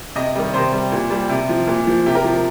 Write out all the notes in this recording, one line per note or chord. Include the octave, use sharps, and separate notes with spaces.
C3 D#5
D#3 G3
C3 C5
G3
A#2
G3
C3
F3
A#2
F3
C3 G4
A#4
F3